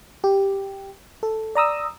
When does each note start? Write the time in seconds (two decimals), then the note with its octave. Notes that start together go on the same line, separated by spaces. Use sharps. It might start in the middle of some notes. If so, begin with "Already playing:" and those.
0.24 G4
1.23 A4
1.55 D5 A#5 D#6 E6